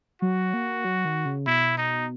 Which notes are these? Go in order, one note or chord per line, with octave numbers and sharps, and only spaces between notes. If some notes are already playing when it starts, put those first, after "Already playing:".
F#3 F#4
A#3
F#3
D#3
C#3
B2 E4
D#4